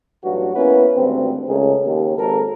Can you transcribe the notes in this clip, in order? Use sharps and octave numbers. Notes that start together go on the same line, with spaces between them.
A1 G2 F#3 F#4
A#3 B3 C#4 E4 B4
G#1 D2 G2 C4
C#2 C#3 A3 C#4 G#4 A#4
D#2
G#1 A4 A#4